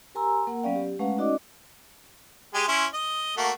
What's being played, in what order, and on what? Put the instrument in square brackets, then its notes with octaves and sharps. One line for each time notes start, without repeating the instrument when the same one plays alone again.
[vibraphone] G4 A#4 G#5 A#5 C6 E6
A#3 A#4 F#5
F#3 B3 C#4 D5 F5 G5
G4
G#3 A3 C#4 B4 F5 F#5
C#4 D#4 F#4 D5 D#5 D6
[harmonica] G#3 G4 G#5
C#4 E4 C6
D#5
A3 A#3 F#4